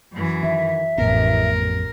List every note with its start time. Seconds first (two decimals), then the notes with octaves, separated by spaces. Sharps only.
0.13 F#2 E3
0.43 D#3 E5
0.98 A1 F2 B3 A#4